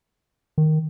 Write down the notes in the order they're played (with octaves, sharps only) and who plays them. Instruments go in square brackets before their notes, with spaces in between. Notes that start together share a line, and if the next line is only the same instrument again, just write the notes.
[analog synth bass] D#3